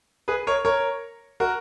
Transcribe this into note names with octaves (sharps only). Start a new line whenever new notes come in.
G#4 B4
A#4 C#5
A#4 C#5
F#4 A#4